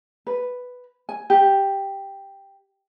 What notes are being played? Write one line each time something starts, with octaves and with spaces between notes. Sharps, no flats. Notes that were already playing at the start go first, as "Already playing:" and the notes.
B4
G#5
G4